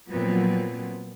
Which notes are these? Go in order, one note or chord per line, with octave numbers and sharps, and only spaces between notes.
A#2 F3 F#3 B3 C4